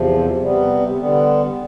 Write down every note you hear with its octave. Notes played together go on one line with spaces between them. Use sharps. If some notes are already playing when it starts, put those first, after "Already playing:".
Already playing: E2 C3 F3
C3 G3 B3
D3 G3 B3